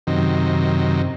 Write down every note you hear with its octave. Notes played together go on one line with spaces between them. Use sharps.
F#2 C3 D#3